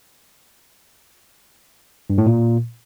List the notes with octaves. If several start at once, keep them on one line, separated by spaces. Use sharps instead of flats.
G2
A2
A#2